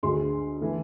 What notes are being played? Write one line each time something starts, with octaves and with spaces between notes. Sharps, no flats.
D2 D3 G#3 C6
E3 A3